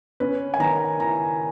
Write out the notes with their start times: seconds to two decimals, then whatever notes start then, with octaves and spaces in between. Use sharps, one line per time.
0.20 C#4 B4
0.54 G#5
0.60 D#3 A#5
1.00 E4 A#5